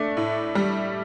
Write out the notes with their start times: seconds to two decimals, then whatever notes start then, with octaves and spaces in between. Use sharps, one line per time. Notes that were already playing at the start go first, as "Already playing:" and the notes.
Already playing: A3 D4
0.17 A2
0.55 G3